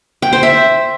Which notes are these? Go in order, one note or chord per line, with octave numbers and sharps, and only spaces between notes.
G5
C5
E5